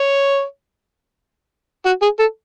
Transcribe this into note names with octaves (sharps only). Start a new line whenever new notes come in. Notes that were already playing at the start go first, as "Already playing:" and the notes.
Already playing: C#5
F#4
G#4
A4